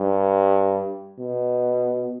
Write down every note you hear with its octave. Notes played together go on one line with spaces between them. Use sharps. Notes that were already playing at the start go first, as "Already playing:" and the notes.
Already playing: G2
B2